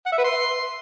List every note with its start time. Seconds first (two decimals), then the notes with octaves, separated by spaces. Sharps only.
0.06 F#5
0.12 E5
0.18 B4
0.24 C6